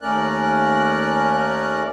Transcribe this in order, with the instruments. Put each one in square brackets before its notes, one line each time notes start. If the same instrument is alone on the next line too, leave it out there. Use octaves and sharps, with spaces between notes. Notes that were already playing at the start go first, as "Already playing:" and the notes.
[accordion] D#2 A3 C#4 A#4 D5 F#6